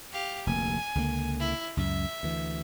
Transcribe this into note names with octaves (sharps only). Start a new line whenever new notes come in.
G4 F5
F1 D2 A#3 G#5
C#2 D3 A#3
E4
C#2 F#2 E5
D2 E3